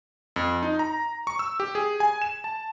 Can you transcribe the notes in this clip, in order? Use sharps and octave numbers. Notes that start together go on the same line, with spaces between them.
F2
D#4
A#5
C#6
E6
G4
G#4
G#5
E7
A5